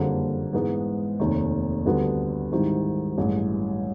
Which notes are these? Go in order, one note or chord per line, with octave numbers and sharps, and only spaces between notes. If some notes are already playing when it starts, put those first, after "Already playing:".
Already playing: F#1 F2 D3 G3 A#3
G#2 E3 G#3 B3
F1 D#2 D#3
D2 D3 G3 B3
G#2 D#3 G3 C4 E4
A1 G2 E3 G#3